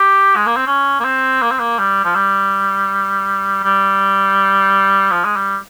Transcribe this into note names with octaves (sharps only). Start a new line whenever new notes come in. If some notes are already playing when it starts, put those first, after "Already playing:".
Already playing: G4
G#3
A#3
C4
C#4
A#3
C4
A#3
C4
A#3
G3
F3
G3
G3
F3
G#3
G3